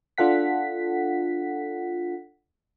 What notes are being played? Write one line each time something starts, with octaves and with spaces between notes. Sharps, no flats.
D4 F4 A4 F#5 B6